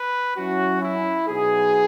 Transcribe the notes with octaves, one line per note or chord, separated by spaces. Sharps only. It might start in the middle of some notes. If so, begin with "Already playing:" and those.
Already playing: B4
F#3 C#4 E4 F#4
E4
B2 F#3 B3 D#4 G#4